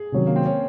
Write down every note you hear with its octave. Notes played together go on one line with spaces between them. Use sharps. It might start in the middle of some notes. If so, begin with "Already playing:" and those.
Already playing: G#4
C3 D#3 F#3 C#4
A#3
C4
C#4